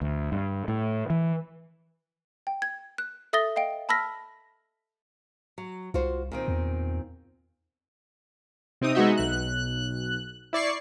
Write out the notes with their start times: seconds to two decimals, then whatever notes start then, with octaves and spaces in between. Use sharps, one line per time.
0.01 D2
0.32 G2
0.68 A2
1.10 E3
2.47 G5
2.62 G#6
2.98 F#6
3.33 A4 E5 D#6 A6 A#6 G7
3.56 D#5 F5 G5 D7
3.89 A5 B5 E6 F6 A#6 B6
5.58 F#3
5.94 C2 F4 F#4 C5
6.32 A#2 D#3 C4
6.48 E2
8.81 C3 C4 D#4 D#6
8.95 G#3 B3 D#4 F#4 D#5 E5
9.17 B1 F#6
10.53 E4 D5 C#6 C7